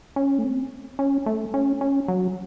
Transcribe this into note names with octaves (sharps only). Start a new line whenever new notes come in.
C#4
A3
C4
C#4
A3
C#4
C#4
F#3